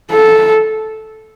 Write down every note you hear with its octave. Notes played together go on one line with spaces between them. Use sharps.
A4